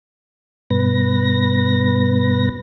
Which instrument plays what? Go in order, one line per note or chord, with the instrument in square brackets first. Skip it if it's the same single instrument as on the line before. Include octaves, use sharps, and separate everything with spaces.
[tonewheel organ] G2 B2 B4 A#6